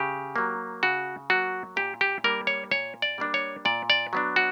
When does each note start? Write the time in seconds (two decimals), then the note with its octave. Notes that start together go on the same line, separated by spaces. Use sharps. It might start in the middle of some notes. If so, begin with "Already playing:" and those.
Already playing: C#3 G4
0.36 F#3 A#3
0.83 C#3 F#4
1.30 F#3 A#3 F#4
1.76 A#2 G4
2.01 G4
2.24 G3 A#3 D4 A#4
2.47 C#5
2.71 A#2 C#5
3.02 D5
3.18 G3 A#3 D4
3.34 C#5
3.65 A#2 D5
3.90 D5
4.13 F#3 B3 D4
4.36 F#4